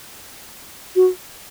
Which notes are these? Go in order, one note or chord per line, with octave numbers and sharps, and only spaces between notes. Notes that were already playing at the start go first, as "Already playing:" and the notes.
F#4